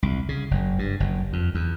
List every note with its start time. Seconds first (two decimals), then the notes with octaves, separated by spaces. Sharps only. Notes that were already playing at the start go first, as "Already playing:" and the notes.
0.03 C2
0.29 C#3
0.51 F#1
0.79 G2
1.00 F#1
1.33 F2
1.55 E2